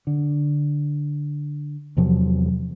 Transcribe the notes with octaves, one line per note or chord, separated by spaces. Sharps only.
D3
E2 C3 F3 F#3